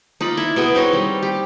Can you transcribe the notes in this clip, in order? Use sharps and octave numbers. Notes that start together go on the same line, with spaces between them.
D#4 F4 D5 B5
E4
B2 B3 G#4
C4 D#4 C#5 D#5
G3
G4